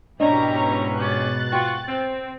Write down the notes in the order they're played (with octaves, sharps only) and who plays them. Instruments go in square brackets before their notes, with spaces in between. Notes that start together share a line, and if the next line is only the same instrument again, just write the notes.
[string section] G#2 B2 [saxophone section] E3 C#4 [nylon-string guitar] D4 D#5 [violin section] G4 A#5
[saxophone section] C#4 G4 C#5 [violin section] F#6 A6
[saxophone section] F4 F#4 [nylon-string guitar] G5
[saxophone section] C4